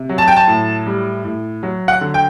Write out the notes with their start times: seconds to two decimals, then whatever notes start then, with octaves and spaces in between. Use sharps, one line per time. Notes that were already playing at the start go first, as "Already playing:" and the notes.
Already playing: C3
0.09 F#3
0.18 A5
0.28 G5
0.36 A5
0.48 A2
0.86 G3
1.24 A2
1.63 F#3
1.88 F#5
2.01 D3
2.14 G5